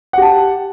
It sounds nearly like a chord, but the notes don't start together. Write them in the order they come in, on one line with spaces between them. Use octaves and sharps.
F#5 G4 A5